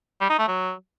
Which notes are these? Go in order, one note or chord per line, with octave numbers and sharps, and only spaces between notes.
G3
D#4
A3
F#3